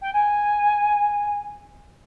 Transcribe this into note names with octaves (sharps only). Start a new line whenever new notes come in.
G5
G#5